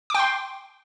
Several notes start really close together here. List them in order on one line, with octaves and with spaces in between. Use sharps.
D6 G5 C6